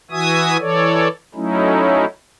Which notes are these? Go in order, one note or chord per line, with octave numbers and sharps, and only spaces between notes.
E3 F#4 E5 G#5 D#6
E3 A4 C#5 D5
F#3 A3 C#4 D#4 E4